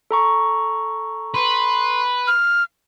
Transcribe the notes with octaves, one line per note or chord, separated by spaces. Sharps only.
A4 A#5 C#6
B4 C6
F6